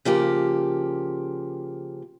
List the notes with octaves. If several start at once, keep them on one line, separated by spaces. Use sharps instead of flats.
C#3 F3 A#3 G4